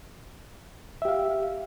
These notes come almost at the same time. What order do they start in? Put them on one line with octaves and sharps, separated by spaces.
E5 G4 F5